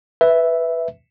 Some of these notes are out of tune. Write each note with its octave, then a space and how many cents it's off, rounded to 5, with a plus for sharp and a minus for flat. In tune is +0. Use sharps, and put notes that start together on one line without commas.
B4 +5 E5 +0